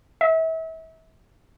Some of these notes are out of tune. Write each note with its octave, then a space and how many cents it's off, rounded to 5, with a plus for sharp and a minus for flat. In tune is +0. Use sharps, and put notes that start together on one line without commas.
E5 -35